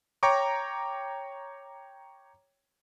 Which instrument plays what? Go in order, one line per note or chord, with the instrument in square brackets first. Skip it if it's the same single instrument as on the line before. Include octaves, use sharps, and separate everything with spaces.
[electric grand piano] C#5 G5 A#5 C#6 D6